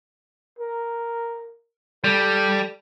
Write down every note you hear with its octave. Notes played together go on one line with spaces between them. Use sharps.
A#4
G3 A4